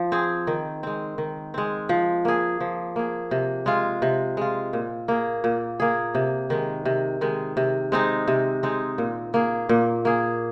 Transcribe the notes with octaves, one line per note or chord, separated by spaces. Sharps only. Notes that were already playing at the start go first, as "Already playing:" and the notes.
Already playing: F3
C4 G#4
D#3
G#3 C4
D#3
G#3 C4
F3
A#3 G#4
F3
A#3 G#4
C3
G#3 F4
C3
G#3 F4
A#2
A#3 G#4
A#2
A#3 G#4
C3
D#3 G#3
C3
D#3 G#3
C3
G#3 C4 D#4
C3
G#3 C4 D#4
A#2
A#3 G#4
A#2
A#3 G#4